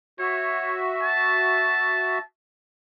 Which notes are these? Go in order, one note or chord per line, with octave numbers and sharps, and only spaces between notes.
F#4 C#5 E5
A5